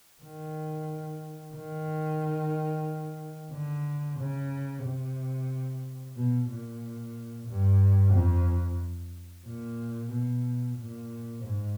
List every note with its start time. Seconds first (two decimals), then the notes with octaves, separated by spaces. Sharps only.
0.23 D#3
1.55 D#3
3.53 D3
4.19 C#3
4.85 C3
6.16 B2
6.50 A#2
7.48 G2
8.14 F2
9.46 A#2
10.11 B2
10.78 A#2
11.44 G#2